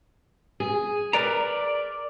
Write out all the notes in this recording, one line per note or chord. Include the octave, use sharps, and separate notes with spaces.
G#4
A#4 B4 D5 A#5
D5